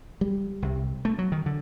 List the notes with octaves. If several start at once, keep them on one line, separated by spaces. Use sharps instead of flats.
G3
C2 C3
A3
F#3
D#3
D3